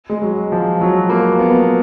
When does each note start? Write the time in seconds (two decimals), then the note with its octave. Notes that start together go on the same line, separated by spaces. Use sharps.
0.10 G#3
0.22 F#3
0.52 F3
0.81 F#3
1.10 A#3
1.39 B3